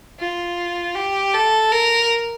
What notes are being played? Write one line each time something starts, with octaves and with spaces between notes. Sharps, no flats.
F4
G4
A4
A#4